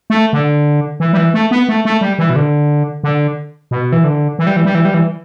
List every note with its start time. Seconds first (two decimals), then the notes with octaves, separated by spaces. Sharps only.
0.10 A3
0.33 D3
1.00 E3
1.13 G3
1.17 E3
1.34 A3
1.51 B3
1.69 A3
1.85 A3
2.01 G3
2.19 E3
2.30 B2
2.36 D3
3.04 D3
3.71 B2
3.92 E3
4.04 D3
4.39 E3
4.47 G3
4.56 E3
4.65 G3
4.75 E3
4.85 G3
4.94 E3